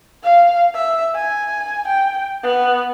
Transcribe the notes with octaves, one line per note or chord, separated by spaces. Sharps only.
F5
E5
G#5
G5
B3